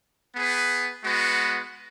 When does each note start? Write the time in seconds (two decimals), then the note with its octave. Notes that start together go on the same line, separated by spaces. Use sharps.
0.35 B3 G#4 B4
1.04 G#3 B3 F#4 B4 F#5